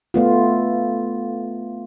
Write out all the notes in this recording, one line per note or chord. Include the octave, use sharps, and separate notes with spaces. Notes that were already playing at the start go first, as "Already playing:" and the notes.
A3 B3 F4